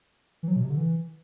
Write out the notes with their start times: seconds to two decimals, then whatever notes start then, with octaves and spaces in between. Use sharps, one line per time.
0.43 E3
0.48 F#3
0.56 B2
0.63 C3
0.70 D3
0.77 E3